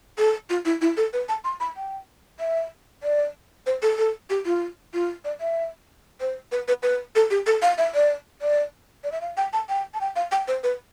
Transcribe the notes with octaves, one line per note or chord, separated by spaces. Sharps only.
A4
F4
E4
E4
A4
B4
A5
C6
B5
G5
E5
D5
C5
A4
A4
G4
F4
F4
D5
E5
C5
B4
B4
B4
A4
G4
A4
F5
E5
D5
D5
D5
E5
F5
G5
A5
G5
A5
G5
F5
G5
C5
B4